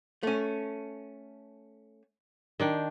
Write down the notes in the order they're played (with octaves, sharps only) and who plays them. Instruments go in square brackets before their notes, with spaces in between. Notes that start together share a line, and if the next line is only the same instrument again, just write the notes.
[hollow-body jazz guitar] A3 C#4
[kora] D#3 D4 G5